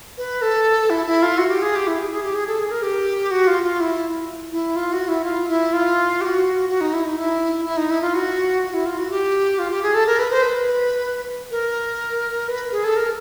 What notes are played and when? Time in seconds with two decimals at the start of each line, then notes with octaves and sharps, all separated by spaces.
0.18 B4
0.42 A4
0.90 E4
1.06 E4
1.22 F4
1.38 F#4
1.50 G4
1.62 G#4
1.75 G4
1.87 E4
1.99 G#4
2.11 G#4
2.23 G4
2.35 G#4
2.47 A4
2.59 G#4
2.71 A#4
2.83 G4
3.31 F#4
3.47 F4
3.63 F4
3.80 E4
4.52 E4
4.76 F4
4.93 F#4
5.08 E4
5.25 F4
5.49 E4
5.73 F4
6.21 G4
6.25 F#4
6.69 F#4
6.81 D#4
6.93 E4
7.05 D#4
7.18 E4
7.65 E4
7.77 D#4
7.90 E4
8.02 F4
8.14 F#4
8.62 F#4
8.74 E4
8.86 F4
8.98 F#4
9.10 G4
9.59 F4
9.71 G4
9.83 G#4
9.94 A4
10.07 A#4
10.19 B4
10.31 C5
10.42 B4
11.51 A#4
12.48 B4
12.72 G#4
12.84 A4
12.96 A#4